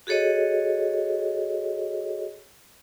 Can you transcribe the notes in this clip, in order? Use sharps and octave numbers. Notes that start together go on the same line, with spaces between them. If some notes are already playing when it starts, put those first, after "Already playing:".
F#4 G#4 A4 C#5 D#5